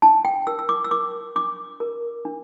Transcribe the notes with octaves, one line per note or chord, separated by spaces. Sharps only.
D4 A5
G5
A#4 E6
E6
D6
E6
A#4 D6
D4 D6
A#4
D4